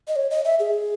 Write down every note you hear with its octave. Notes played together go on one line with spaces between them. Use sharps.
D#5
C#5
D#5
E5
G#4